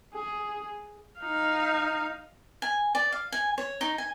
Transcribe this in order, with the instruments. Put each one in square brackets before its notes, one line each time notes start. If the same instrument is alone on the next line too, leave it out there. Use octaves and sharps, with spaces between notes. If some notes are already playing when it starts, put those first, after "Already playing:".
[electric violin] G#4
[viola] D#4 F5
[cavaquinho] G#5
D5
F5
G#5
C#5
D#4
G#5